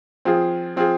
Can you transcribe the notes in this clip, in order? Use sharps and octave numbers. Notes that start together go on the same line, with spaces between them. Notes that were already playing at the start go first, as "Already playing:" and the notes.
F3 C4 F4 G#4
F3 C4 F4 G#4